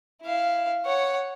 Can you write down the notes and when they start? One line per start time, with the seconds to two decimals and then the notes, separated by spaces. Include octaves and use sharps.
0.23 E4 F5
0.86 C#5 F#5